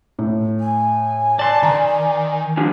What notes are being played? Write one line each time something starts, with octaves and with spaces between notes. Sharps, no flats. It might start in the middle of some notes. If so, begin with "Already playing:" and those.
A2
G#5
D5 A5 C6
D#3 A#5
D3 F3 G3